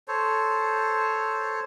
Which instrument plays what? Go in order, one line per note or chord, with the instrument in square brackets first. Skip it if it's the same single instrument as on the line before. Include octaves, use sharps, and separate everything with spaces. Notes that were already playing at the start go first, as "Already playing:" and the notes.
[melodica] A4 C5 C#5